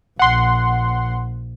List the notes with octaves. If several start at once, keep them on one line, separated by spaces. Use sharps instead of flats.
A#1 F#5 C6